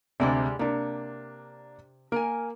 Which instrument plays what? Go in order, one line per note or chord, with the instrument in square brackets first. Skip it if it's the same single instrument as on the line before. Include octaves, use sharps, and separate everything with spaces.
[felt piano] D2 C3 [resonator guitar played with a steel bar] G3 G#3 D5
[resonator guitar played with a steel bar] C3 [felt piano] A#3 D4
[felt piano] A#3 [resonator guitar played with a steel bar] A#4 G#5